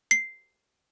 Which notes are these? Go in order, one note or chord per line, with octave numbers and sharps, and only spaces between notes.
C7